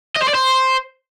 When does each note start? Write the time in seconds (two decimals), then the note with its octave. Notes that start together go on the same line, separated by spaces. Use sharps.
0.16 D#5
0.22 C5
0.28 D5
0.34 C5